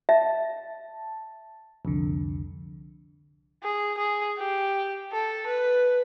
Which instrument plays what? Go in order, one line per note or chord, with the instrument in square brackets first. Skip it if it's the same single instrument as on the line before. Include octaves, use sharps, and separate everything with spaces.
[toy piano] E5 [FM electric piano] A5
[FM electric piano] C2 F2 D3
[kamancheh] G#4
G#4
G4
A4
B4